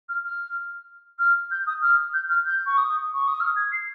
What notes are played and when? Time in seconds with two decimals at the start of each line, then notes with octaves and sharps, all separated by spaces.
0.09 F6
0.24 F6
1.19 F6
1.51 G6
1.67 D#6
1.82 F6
2.14 G6
2.30 F6
2.46 G6
2.66 C#6
2.78 D#6
3.14 C#6
3.28 D#6
3.40 F6
3.56 G#6
3.72 C7